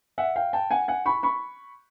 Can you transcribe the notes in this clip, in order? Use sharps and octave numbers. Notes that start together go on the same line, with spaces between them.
E5 F#5
F5 G5
G5 A5
F#5 G#5
F#5 G#5
B5 C#6
B5 C#6